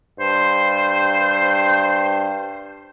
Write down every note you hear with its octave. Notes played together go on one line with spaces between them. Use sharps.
G2 C5